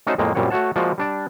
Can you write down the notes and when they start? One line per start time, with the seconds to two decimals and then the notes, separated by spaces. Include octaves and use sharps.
0.07 A3 C#4 D#4 F#4 A4 C5
0.18 F2 A2 G#3 A#3 C4
0.35 F#2 A#2 G3 C4 C#5 F#5
0.50 A3 F#4 C#5 F#5 A5
0.76 F3 G#3 A#3 F4 F#4 D5
0.98 G3 D4 D5